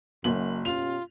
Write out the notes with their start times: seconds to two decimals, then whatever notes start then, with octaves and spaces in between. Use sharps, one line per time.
0.24 F#1 F#2 F#7
0.65 B2 C#4 F4 G4 F7